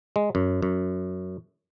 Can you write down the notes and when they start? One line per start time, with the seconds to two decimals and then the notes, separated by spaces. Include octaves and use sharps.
0.16 G#3
0.35 F#2
0.62 F#2